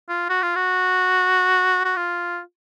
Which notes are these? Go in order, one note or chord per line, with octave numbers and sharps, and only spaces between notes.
F4
F#4
F4
F#4
F#4
F4